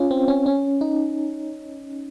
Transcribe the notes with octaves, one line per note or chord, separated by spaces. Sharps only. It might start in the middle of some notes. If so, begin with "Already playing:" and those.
Already playing: C#4 F4
C4
C#4
C#4
D#4